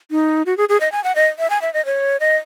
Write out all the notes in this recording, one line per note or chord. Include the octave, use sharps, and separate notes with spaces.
D#4
F#4
G#4
G#4
D#5
G#5
F#5
D#5
E5
G#5
E5
D#5
C#5
D#5